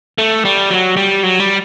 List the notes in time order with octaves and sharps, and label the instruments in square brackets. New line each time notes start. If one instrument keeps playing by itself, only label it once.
[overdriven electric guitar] A3
G3
F#3
G3
F#3
G3